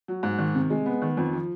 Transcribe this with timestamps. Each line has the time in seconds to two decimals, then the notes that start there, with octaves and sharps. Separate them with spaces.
0.08 F#3
0.23 G#2
0.39 D#3
0.55 C3
0.70 G#3
0.86 B3
1.02 D#3
1.17 F2
1.33 F3